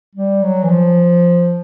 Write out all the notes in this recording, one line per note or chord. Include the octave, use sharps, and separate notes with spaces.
G3
F#3
E3
F3